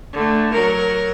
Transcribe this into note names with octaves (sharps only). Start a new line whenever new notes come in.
D3 A3
F#3 A#4